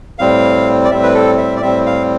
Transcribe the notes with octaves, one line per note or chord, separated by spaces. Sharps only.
A2 G3 C4 F5
D5
A2 G3 C4 E5
B4
A4
E5
D5
A2 G3 C4 E5
F5